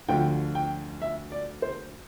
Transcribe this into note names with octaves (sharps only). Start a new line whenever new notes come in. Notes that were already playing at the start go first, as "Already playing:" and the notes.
D2 D3 F3 G5
G5
E5
D5
C5